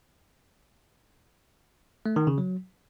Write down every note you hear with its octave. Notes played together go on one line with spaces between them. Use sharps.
A3
D#3
C#3
F#3